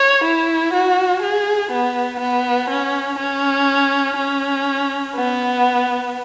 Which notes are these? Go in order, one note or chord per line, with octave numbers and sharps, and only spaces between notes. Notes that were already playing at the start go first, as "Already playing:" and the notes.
Already playing: C#5
E4
F#4
G#4
B3
B3
C#4
C#4
C#4
B3